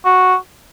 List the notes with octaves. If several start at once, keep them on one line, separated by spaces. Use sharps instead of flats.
F#4